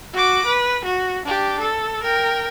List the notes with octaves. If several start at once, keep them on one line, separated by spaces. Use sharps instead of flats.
F#4 D6
B4
F#4
D4 G4
A4
A#4 G5